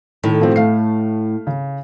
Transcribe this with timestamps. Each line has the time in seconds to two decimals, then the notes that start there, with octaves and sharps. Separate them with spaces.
0.24 A2 D#3
0.39 B2 F3 C4
0.56 A3 F5 C7
1.47 C#3